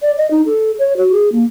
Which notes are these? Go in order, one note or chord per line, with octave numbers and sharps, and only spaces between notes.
D5
D#5
D#4
A4
C#5
F#4
G#4
A#3